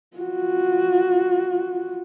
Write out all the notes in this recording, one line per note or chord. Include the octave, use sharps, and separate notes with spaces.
F4 F#4